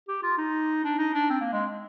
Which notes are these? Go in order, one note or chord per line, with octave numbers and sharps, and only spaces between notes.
G4
F4
D#4
D4
D#4
D4
C4
A#3
G#3